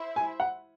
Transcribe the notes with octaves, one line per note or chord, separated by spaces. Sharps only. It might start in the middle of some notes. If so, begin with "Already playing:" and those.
Already playing: E4 C5 E5
G#5
F#5